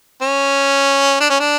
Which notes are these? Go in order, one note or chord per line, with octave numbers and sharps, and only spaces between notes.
C#4
D4
C#4
D4